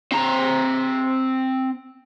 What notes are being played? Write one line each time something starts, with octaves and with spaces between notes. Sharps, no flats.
C4 A#5